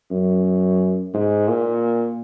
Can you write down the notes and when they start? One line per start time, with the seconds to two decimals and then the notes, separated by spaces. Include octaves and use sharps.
0.11 F#2
1.14 G#2
1.48 A#2